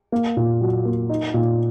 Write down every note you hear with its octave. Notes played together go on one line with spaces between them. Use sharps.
A#3
A#2
F#3
A#3
D#4
A#2